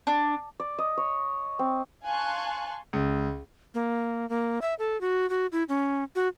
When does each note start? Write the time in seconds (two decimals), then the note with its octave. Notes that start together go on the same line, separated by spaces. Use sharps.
0.07 D4
0.60 D5
0.78 D#5
0.97 C#5
1.59 C4
2.04 F5 G#5 A5 C6 C#6 F#6
2.93 C#2
3.74 A#3
4.29 A#3
4.62 E5
4.79 A4
5.01 F#4
5.30 F#4
5.52 E4
5.69 C#4
6.15 F#4